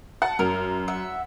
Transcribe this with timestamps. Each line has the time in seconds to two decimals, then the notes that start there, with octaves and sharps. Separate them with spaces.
0.22 F#5 A5
0.39 F#2 A#4
0.88 E5 F#5